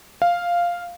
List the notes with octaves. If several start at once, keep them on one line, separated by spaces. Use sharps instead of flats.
F5